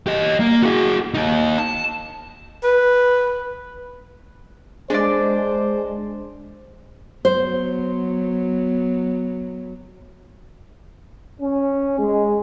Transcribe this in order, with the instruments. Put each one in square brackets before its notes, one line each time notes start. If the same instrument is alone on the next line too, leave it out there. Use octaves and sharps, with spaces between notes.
[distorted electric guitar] G4 D#5
A#3
F#4 G#4
A#3 D#4
A5
[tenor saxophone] B4
[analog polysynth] G#3 [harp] D4 D5 [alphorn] C5
[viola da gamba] F#3 B3 [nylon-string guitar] C5
[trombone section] C#4
G#3